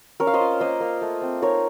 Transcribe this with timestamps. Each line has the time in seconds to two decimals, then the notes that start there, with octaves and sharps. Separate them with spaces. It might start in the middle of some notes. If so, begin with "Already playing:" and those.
0.20 C#4 A#4 C#5
0.27 F5
0.34 C5 D#5
0.40 F4
0.60 A#3 C5 D#5
0.81 A#3
1.02 A3
1.22 C4
1.42 D#4 A#4 C#5